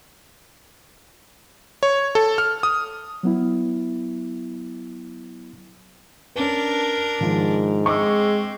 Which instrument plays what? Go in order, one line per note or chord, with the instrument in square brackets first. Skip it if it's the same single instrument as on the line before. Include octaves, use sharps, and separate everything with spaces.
[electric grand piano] C#5
A4
F6
D#6
[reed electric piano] F#3 B3 E4
[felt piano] C#4 B4 [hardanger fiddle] D4 A#4
[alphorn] G#2 [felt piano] D#3 F3
[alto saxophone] G#3 [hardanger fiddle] C4 [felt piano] C#6 D6 E6